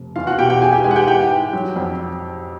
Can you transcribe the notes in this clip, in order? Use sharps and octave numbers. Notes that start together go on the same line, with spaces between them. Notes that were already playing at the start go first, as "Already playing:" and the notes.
Already playing: F1
E2 F4 F5
F#4 F#5
B2 G4 G5
G4 G5
E2 G#4 G#5
G4 G5
G#3 G#4 G#5
F#5
G4 G5
E3 G4 G5
G#2
F#3
F2